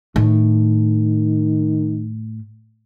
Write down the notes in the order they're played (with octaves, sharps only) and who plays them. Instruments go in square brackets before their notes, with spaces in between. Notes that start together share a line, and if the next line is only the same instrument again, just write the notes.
[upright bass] A2 [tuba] D#3